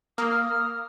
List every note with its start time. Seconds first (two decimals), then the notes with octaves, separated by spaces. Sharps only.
0.18 A#3 D#6 F6